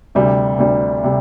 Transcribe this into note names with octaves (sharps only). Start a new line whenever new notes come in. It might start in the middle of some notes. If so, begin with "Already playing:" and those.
D2 C3 G3
D2 C3 G3
C3 G3